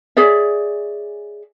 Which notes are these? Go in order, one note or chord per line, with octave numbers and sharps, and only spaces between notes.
G#4 C#5 D5 E5